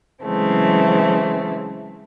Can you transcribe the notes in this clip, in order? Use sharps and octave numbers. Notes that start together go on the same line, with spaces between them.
C#3 E3 F#3 G#3 A3 C4